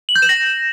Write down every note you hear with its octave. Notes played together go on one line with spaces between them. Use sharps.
F#7
G6
E7
A#6